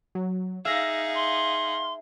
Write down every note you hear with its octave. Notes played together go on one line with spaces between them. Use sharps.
F#3
D#4 G#4 E5 F5 A#6
C6